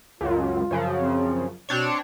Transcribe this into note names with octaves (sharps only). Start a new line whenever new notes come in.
C#2 F#2 F4
F#2 C#3 F3
C4
B2 C4 D4 C#5